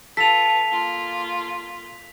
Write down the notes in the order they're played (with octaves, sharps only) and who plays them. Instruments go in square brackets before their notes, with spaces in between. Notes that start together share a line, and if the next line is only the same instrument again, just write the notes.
[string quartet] F4 B4 [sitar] A4 [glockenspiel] B6 F7
[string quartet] A#3 F4